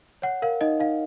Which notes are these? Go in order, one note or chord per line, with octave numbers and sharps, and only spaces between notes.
C#5 F#5
A#4 F5
D#4 D#5
D#4 F5